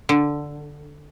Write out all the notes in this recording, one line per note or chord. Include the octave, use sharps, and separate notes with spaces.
D3